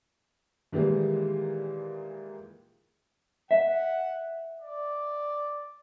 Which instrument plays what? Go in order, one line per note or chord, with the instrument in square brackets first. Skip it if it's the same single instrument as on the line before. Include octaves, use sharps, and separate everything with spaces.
[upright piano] A#2 D#3 E3 G3 G#3 A#3
[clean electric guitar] E5 [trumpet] F#5
[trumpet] D5